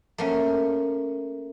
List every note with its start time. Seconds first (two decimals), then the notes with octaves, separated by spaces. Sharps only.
0.18 A3 A#3 C#4